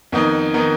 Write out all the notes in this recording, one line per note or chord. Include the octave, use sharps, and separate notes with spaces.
F2 D#3 B3 D#4
D#3 B3 D#4